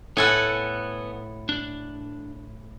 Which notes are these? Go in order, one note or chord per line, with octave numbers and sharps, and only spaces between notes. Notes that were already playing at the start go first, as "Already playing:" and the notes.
A2 B3 A4 F#5 G#5
D4